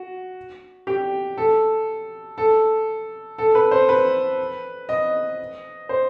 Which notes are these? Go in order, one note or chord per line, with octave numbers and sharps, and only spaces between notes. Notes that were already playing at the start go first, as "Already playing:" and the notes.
Already playing: F#4
G4
A4
A4
A4
B4
C5
B4
D#5
C5